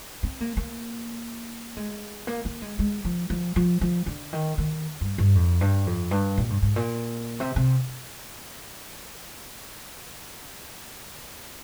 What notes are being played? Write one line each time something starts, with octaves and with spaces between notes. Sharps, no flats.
C4
A#3
A#3
G#3
A#3
A#3
G#3
G#3
F3
F3
F3
F3
D3
D#3
D#3
G2
G2
F2
G2
F2
G2
A#2
G2
G#2
A#2
C3
C3